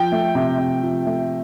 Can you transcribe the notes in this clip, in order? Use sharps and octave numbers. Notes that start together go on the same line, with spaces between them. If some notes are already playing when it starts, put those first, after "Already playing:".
Already playing: F3 G5
A3
C3
C3
F3
A3